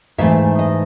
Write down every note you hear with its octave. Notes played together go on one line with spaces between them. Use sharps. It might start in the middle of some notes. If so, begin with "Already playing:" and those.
G#2 E3 A3 E5
D#5